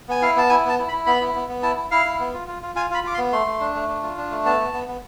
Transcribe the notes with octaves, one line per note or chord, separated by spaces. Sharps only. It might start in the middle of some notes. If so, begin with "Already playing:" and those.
B3 G#5
E4 F5
B3 A5
E4 G#5
B3 A5
E4
B5
E4
B3 B5
E4
B3
B3
E4 A5
E4
E4 F5
E4
B3
F4
F4
F4
F4 G#5
F4 B5
F4 D6
C6
B3
A3 C6
A3
D4
A3
D4
F4
D4
A3
B3 A5
B3
B3
B3